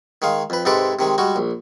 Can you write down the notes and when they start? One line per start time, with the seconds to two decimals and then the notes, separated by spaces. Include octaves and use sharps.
0.22 D#3 G#3 F5
0.50 F2 B4
0.65 G#2 C3 G#3 A4 B4 D6
0.99 C3 D#3 G#3
1.18 G3 G#3 F#4
1.36 A#1